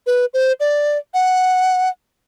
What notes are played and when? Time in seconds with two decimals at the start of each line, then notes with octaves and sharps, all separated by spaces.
0.07 B4
0.34 C5
0.60 D5
1.14 F#5